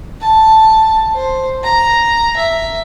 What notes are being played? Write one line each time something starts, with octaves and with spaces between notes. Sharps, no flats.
A5
C5
A#5
E5